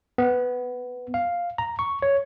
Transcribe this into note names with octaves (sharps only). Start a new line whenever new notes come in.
B3
F5
A#5
C#6
C#5